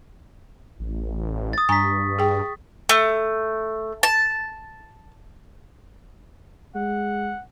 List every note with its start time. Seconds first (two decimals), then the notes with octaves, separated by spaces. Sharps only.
0.80 A1
1.53 D#6 A6
1.69 G2 G#5 A#5 C#6 B6
2.19 G#4 G5
2.89 A3
4.03 A5
6.75 G#3 F#5